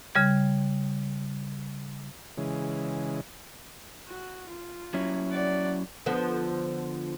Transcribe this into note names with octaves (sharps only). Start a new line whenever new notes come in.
C#3 G3 G#6
C#3 E3 G#3
F#4
F4
F#3 C#4 E4
D5 F#5
D3 F3 B3